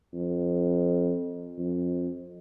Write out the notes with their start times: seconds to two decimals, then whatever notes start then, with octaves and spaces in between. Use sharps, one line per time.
0.14 F2
1.59 F2